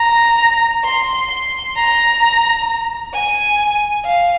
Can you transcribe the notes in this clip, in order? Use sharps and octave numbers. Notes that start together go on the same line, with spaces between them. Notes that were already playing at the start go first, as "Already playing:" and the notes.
Already playing: A#5
C6
C6
A#5
G#5
F5